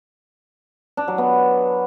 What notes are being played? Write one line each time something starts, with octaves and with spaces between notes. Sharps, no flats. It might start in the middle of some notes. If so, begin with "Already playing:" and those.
D4
F#3
B3